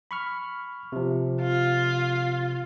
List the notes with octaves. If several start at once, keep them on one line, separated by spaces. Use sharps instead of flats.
B5 C#6 F6
C3 F3
F4